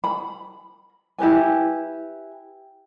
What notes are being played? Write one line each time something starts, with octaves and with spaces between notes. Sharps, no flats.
B5
E4 G4 B4 G#5